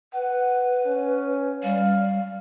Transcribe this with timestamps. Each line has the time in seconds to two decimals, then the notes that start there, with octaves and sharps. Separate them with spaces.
0.14 B4 F#5
0.86 C#4
1.63 G3 F5